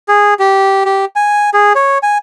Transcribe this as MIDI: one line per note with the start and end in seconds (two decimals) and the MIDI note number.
0.08 0.34 68
0.39 0.83 67
0.86 1.05 67
1.16 1.50 80
1.54 1.73 68
1.75 1.98 73
2.03 2.18 80